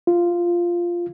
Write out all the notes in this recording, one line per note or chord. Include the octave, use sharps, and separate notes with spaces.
F4